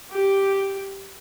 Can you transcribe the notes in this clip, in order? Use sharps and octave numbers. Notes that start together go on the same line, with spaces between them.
G4